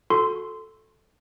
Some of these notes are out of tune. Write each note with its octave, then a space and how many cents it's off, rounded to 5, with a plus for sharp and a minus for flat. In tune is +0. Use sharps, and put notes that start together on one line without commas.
F#4 -30 A4 +0 C6 -15